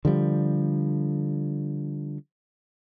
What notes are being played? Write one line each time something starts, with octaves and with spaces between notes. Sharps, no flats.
D3 F3 G3